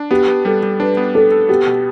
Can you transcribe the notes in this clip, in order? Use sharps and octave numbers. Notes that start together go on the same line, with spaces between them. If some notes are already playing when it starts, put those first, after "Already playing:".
Already playing: D4
B3 G4
B3
G3 A4
G3
D4 B4
B3
D4 A4
A4
B3 G4
B2